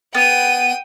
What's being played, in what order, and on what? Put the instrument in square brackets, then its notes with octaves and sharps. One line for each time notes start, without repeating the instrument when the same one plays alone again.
[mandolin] B3 [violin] G5 D#7